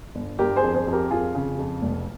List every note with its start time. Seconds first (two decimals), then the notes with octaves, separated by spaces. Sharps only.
0.15 G1
0.39 G1 G4 A#4
0.56 G#4 C5
0.63 F2
0.75 G#4 C5
0.87 F2
0.93 G4 A#4
1.11 F2 F4 G#4
1.35 C#3
1.59 F2
1.82 F1